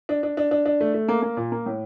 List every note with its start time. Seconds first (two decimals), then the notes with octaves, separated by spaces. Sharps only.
0.09 D4
0.23 D4
0.37 D4
0.51 D4
0.66 D4
0.81 A3
0.94 A3
1.08 A#3
1.22 A#3
1.37 A#2
1.52 A#3
1.66 A2